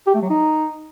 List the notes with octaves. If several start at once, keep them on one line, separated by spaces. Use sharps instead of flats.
G4
A3
F#3
D#4